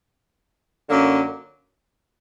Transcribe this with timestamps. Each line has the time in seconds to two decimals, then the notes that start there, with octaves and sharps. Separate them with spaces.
0.87 F#2 D3 F#3 A#3